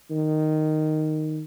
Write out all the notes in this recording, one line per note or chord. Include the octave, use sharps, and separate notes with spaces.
D#3